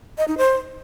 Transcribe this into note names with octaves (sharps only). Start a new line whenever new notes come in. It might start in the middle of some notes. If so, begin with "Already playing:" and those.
D#5
D#4
C5